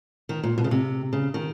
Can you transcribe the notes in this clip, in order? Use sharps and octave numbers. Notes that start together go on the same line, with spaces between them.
D#3
A#2
B2
C#3
C3
C#3
D#3